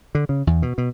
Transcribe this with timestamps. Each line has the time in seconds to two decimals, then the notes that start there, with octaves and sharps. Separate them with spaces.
0.15 D3
0.29 C#3
0.47 E2
0.62 B2
0.78 B2